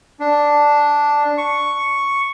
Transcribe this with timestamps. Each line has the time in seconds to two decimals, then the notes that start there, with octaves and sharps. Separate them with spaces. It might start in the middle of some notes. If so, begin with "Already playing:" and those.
0.20 D4
1.38 C#6